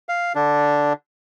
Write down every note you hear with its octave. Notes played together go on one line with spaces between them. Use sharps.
F5
D3 D4